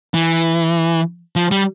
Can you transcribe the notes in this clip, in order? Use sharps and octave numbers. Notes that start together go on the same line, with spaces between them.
E3
F3
G3